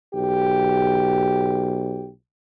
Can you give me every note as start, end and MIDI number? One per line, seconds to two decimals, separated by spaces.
0.14 2.12 35
0.14 2.09 67